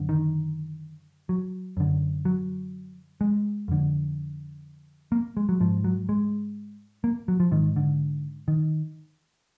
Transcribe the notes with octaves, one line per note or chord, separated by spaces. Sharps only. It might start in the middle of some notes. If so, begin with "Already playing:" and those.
Already playing: F#2 D3
D#3
F#3
F#2 D3
F#3
G#3
F2 D3
A#3
G#3
F#3
G#2 F3
F#3
G#3
A#3
F#3
F3
G#2 D#3
D3
D#3